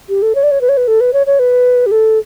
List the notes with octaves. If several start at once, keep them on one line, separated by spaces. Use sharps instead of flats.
G4
A4
C#5
D5
C#5
B4
C#5
B4
A4
B4
C#5
C#5
B4
G4
A4